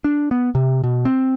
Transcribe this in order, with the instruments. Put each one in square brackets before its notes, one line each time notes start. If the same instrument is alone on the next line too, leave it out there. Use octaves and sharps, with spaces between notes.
[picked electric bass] D4
B3
C3
B2
C4